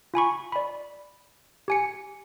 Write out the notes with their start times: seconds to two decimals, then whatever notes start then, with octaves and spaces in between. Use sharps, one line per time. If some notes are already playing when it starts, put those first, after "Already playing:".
0.14 F4 G#5 B5 C#6
0.52 D5 B5
1.68 G4 G#5 C#7